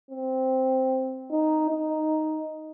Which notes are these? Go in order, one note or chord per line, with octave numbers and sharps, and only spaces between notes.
C4
D#4
D#4